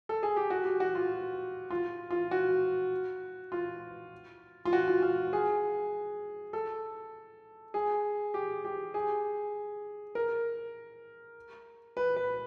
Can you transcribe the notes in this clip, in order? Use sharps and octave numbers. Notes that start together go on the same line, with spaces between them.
A4
G#4
G4
F#4
G4
F#4
F4
F4
F4
F#4
F4
F4
F#4
F4
F4
G#4
A4
G#4
G4
G4
G#4
A#4
B4
B4